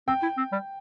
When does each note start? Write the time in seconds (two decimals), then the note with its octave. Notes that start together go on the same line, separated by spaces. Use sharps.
0.08 C4 G5
0.23 E4
0.37 C4
0.52 G3